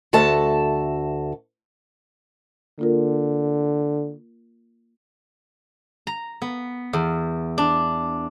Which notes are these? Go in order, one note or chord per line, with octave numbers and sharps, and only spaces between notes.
D2 F#4 A4 E5 A5
D3 A#3 F4 A#4
A#5
B3
E2
D4